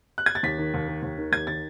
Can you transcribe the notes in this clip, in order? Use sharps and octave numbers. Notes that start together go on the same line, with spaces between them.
F#6
G#6
A6
D#2 B6
D#3
D#2
D#3
D#2
D#3
D#2 G#6
D#3 A6